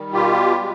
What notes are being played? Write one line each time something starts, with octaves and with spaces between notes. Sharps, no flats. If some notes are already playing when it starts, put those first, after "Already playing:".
Already playing: D#3 G3
B2 F4 G4
G#3